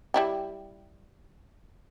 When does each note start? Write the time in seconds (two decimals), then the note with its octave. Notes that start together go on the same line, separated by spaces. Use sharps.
0.14 G3 E4 G4